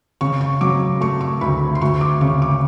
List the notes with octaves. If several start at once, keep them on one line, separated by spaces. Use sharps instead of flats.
C#3 C#6
C#6
F#3 D6
A3 C#6
C#6
D2 B5
C6
D2 C#6
D6
C#3 C#6
D6